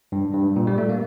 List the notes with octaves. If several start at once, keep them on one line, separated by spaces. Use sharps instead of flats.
G2
G2
A#2
G3
A3
A#3